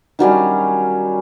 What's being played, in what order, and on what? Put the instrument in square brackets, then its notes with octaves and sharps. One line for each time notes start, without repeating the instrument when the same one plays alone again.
[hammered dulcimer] D#3 F#3 G3 C#4